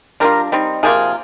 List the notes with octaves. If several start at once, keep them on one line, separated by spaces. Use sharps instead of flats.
G3 D4 F4 A#4
G3 C4 D#4
C3 F3 A#3 F4 G#4